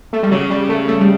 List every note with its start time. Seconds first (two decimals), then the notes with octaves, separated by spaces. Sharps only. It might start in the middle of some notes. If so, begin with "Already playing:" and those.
0.13 A3
0.23 G3
0.31 C#3 F#3
0.50 G3
0.69 A3
0.88 A3
1.00 G3